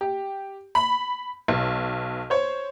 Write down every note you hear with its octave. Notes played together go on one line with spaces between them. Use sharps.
G4
B5
B1
C5 C#5